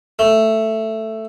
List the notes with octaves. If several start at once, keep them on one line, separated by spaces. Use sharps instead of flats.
A3